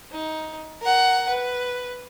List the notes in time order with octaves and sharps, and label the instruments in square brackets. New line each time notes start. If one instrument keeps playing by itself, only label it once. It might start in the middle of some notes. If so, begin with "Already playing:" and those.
[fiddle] D#4
A#4 F#5
B4